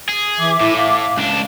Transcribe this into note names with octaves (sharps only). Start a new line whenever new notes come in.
G#4
E3 E5 D6
A2 E4
F5
C#2 D4